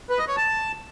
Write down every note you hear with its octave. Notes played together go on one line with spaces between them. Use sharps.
B4
D#5
C#5
A5